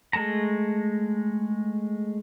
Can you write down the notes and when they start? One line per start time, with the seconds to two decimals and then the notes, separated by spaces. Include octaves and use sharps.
0.13 G#3 A3 A5 A#5